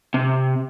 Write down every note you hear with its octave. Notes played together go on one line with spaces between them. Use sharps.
C3